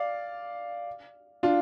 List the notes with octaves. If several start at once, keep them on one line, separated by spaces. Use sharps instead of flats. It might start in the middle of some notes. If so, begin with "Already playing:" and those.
Already playing: D5 F5
D4 F4